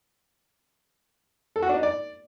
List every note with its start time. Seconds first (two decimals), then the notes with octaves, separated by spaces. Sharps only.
1.56 A4
1.63 F#4
1.69 D4
1.76 D#4
1.83 D5